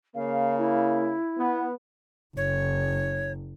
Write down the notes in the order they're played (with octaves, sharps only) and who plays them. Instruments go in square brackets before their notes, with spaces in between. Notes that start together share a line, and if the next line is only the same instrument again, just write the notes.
[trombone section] C#3 A#3 [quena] F5
[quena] E4
[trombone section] B3
[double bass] F#1 [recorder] C#5